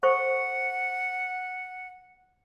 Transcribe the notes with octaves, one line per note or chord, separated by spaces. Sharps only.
A4 C5 F#5 C#6